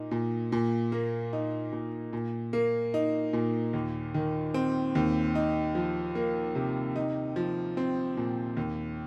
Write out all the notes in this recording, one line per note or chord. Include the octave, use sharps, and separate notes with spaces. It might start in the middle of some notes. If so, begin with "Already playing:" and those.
Already playing: A#2 A#3 D#4
A#2
A#2
A#3
D#4
A#2
A#2
A#3
D#4
A#2
D#2
D#3
C4
D#2
D#4
F3
A#3
C3
D#4
F3
C4
A#2
D#2